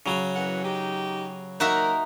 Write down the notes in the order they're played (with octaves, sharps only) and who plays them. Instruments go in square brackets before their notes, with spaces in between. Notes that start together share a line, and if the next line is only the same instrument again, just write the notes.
[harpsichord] C#3 F#3
[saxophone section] F#2 E3 F#5
D#4 G4
[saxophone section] A#3 A#4 [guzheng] D#4 F#4 E5